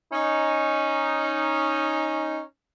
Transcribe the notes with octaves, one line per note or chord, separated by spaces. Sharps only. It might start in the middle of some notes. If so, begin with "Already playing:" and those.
C#4 D#4